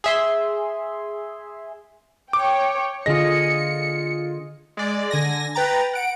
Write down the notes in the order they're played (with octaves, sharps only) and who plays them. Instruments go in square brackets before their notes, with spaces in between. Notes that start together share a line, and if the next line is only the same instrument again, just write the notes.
[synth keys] G#4 E5 C6
[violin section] C#5 G5 [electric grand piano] D6
[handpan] D3 G#4 D#5 [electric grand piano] F4 A#6 [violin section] C#7
[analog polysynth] G#3 D5
D3 G#5 A#6
B4 G5 A#5 A6
F#5 D7